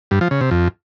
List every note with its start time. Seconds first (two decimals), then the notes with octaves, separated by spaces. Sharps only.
0.11 G2
0.21 F3
0.31 C#3
0.41 C3
0.51 F2